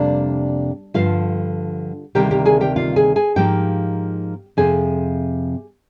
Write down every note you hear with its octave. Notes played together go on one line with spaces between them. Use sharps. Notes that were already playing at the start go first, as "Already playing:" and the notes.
Already playing: F2 C3 G3 A#3 D4 D5
G2 D3 F3 F4 F5
D2 C3 D#3 G3 A#3 G4 G5
G4 G5
G#4 G#5
G4 G5
F4 F5
G#4 G#5
G#4 G#5
G#2 F3 A#3 D#4 G4 G5
F2 C3 F3 G#4 G#5